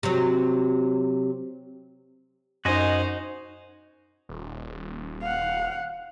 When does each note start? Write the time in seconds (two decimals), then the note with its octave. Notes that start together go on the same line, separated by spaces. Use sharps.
0.03 C3 F#3
2.65 F#2 D#4 F#4 C5 D#5 G#5
4.29 D#1
5.22 F5 F#5